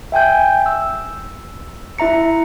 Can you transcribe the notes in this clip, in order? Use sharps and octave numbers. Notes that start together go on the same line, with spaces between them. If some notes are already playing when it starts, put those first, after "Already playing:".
E5 G5 G#5 G6
E6
E4 E5 A#5 C#7